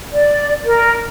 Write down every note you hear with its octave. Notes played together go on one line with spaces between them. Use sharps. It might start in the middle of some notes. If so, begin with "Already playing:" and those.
D5
A#4